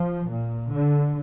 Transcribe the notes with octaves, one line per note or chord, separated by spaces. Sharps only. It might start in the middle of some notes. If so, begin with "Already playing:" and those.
Already playing: F3
A#2
D3